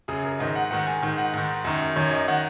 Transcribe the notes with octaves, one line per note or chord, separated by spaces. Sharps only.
F#2 C#3 G#4
A#4
G#2 D#3 D#5
F#5
G#2 D#3 F#5
G#5
G#2 D#3
F#5
G#2 D#3
F#2 D#3
F#2 D#3 C#5
D#5
D#3 F#5